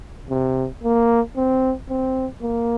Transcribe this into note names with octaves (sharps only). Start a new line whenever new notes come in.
C3
A#3
C4
C4
A#3